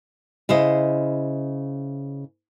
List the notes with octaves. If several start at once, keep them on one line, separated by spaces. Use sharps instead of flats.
C#3 E4 C5 D#5